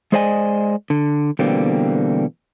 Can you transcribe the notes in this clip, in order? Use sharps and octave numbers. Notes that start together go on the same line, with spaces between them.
G#3 G#4 C5 D5 D#5 G#5
D3
B2 D3 E3 G3 A#3 C4